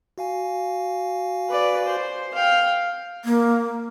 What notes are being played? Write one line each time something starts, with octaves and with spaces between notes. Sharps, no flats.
F#4 F5 G#5
B4 D5
C5
F5 G5
A#3